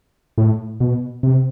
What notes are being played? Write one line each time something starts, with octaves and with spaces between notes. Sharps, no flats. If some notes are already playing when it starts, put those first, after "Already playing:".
A2
B2
C3